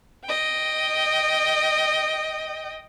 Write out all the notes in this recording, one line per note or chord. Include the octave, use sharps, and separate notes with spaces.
D#5 G5